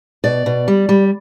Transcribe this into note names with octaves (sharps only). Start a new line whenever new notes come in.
B2 D5
B2
G3
G3